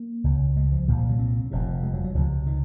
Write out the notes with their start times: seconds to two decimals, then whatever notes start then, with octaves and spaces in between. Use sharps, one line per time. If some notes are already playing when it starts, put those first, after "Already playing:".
Already playing: A#3
0.24 C#2 C#3
0.56 G#3
0.72 F3
0.88 C2 A#2 D#3
0.99 F3
1.09 F#3
1.19 C4
1.51 F1 F2 C3
1.83 G#3
1.94 F#3
2.04 F#3
2.15 C#2 C3 F3
2.46 D#3